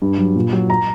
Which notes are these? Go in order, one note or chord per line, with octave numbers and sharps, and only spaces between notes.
G2
F#3
A#2
F#3
A#5